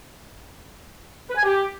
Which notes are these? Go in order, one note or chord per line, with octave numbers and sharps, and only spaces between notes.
B4
G#5
G4